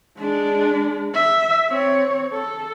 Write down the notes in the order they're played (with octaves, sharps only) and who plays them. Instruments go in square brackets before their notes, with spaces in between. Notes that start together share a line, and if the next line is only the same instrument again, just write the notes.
[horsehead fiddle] G#3 D4
E5
C4 C#5
A4